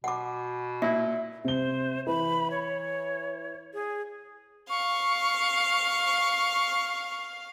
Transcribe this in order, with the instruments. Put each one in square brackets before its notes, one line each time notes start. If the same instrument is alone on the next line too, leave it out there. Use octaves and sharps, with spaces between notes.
[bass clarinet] B2 [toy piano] F#5 D6
[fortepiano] A#2 E4 [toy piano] E5
[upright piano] C3 G7 [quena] C5
[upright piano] E3 [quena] B5
[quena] C#5
G#4
[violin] F5 [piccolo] C#6